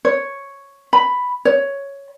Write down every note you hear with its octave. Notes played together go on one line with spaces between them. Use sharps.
C#5
B5
C#5